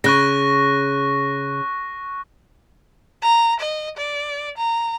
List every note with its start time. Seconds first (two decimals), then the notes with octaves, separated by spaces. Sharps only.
0.04 C#3 C#6 F#6 A#6
3.22 A#5
3.60 D#5
3.97 D5
4.57 A#5